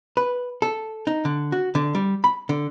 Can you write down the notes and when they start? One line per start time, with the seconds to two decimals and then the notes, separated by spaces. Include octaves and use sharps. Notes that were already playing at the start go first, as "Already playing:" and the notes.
0.17 B4
0.62 A4
1.07 D#4
1.25 D3
1.52 F#4
1.75 D3
1.95 G3
2.24 B5
2.49 D3